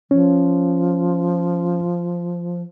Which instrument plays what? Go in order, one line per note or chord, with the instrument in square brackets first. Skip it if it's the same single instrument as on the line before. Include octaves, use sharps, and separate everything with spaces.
[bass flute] F3 [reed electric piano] C#4